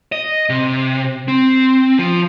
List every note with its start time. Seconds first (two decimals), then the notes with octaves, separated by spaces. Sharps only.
0.12 D#5
0.49 C3
1.28 C4
1.99 F3